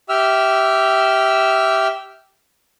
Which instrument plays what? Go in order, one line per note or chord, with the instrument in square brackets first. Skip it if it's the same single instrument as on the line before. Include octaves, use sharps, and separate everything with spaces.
[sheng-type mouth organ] G4 E5 E6 F6